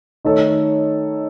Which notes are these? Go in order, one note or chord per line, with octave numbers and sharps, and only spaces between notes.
D#3 A3 D#4 A4 C#5